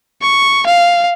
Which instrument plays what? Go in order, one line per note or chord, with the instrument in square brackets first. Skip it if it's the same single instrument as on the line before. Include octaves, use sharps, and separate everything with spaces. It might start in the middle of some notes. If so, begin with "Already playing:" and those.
[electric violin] C#6
F5